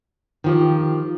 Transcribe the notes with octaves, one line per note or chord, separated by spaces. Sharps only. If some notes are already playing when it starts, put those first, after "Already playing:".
D#3 F3 G4